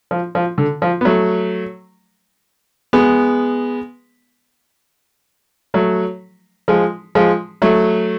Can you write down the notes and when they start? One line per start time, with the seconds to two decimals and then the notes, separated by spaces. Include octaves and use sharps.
0.11 F3
0.35 F3
0.58 D3
0.82 F3
1.01 B3
1.05 F#3 A3
2.93 G#3 B3
5.74 F#3 A3
6.68 F3 G#3
7.15 F3 G#3
7.62 F#3 A3